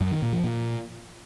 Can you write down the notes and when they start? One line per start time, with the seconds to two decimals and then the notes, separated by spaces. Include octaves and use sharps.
0.01 F#2
0.11 D#3
0.22 A#2
0.33 F3
0.44 A#2